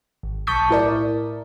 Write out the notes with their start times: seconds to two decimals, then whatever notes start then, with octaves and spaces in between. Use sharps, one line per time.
0.23 G#1
0.47 B1 A5 C#6 D#6 G6 B6
0.69 A2 E4 A#4 D5